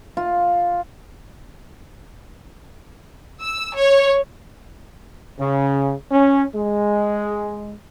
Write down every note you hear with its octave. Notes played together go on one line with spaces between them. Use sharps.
F4
E6
C#5
C#3
C#4
G#3